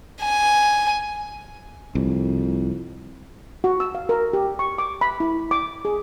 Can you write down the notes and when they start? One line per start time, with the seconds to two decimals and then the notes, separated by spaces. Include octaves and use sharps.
0.23 G#5
1.95 C2 F2
3.64 F#4
3.80 E6
3.95 F5
4.09 A#4
4.33 G4
4.59 C#6
4.78 D6
5.01 B5
5.20 E4
5.51 D6
5.85 G#4